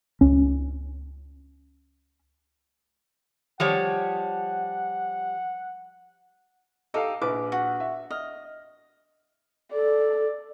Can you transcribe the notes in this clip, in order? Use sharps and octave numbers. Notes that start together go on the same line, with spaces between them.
C#2 C#4
F3 G3 C#5 F#5
D#4 G4 A4 D#5 F5
A#1 B4 D6
F#4
E5
D#5 F6
A4 D5